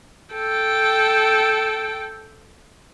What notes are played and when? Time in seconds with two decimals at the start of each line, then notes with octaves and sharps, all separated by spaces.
0.35 A4 G5